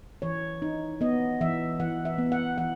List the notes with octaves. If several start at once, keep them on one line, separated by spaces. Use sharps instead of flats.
E3 C#5
D#4
B3 D#5
E3 E5
E3 F#5
E5
B3
F#5
E3 F#5